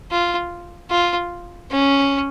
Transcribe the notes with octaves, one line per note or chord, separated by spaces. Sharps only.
F4
F4
C#4